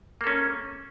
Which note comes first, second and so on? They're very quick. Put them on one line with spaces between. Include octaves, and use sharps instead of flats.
A#3 A4 C#4